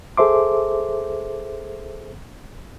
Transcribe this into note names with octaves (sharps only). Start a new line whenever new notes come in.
G#4 A4 C5 E5 C6 D6